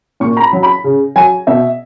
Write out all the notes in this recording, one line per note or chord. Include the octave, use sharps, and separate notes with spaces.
A#2 C#6
A#5
B5
F#3
B5
C#3
F#3 G#5
B2 E5